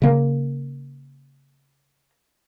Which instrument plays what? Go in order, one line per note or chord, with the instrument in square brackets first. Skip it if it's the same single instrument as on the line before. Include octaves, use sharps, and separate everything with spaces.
[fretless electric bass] C#3 A#3